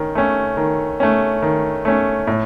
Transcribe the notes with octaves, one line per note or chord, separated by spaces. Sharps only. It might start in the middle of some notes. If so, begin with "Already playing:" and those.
Already playing: D#3 C#4
A3 C#4
D#3
A3 C#4
D#3
A3 C#4
A2